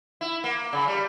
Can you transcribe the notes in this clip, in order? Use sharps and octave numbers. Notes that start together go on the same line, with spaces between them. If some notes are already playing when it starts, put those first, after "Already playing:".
E4
A#3
C#3
G3